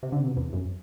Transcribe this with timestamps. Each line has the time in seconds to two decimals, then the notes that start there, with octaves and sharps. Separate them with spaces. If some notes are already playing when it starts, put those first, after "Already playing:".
0.03 C3
0.12 D3
0.19 C3
0.27 B2
0.37 E2
0.53 F#2